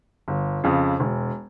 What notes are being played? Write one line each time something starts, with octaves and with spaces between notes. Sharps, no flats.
G1
F2 C#3
E1